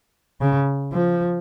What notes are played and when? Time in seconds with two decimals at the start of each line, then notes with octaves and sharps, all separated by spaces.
0.41 C#3
0.93 F3